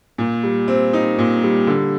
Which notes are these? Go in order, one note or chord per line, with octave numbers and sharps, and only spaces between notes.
A#2
G3
C4
D#4
A#2
G3
D3